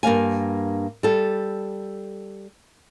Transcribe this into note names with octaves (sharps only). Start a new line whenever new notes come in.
G2 A#3 F5 G#5
G3 A4